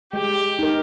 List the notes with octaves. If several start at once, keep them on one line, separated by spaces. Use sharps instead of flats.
G#3 G4
D#4 A#4